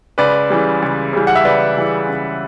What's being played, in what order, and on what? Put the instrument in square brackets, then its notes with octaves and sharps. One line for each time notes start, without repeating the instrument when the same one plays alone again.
[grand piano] C#2 B4 D5
C#3 E3 G3
C#2
C#3 E3 G3
F#5
E5
C#2 B4 D5
C#3 E3 G3
C#2